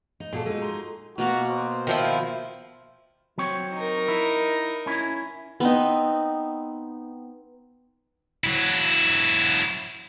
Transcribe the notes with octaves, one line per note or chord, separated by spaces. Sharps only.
D#4
A#2 F4 F#4 G#4 A4
G#3 D#4 A4
A#5 C6
B2 A#3 F#4 A#5
C5
D#3 F3 E4
F#3 C4 C#5
D#4 A#4
E4
C#4 E4
B3 C4 D#4
F#3 E4